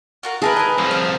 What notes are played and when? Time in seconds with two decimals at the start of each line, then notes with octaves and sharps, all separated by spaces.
0.23 F4 F#4 A#4
0.42 G#4 A#4 B4 E5 A5
0.56 D#5 G#5
0.78 C2 F3 E5
0.91 F5